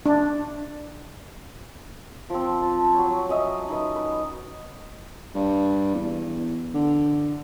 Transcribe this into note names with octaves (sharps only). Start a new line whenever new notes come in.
D4
F3 C4
A5
F#3 C#5
C#4 D#5 E5
D#4 B4
B4
G2
E2
D3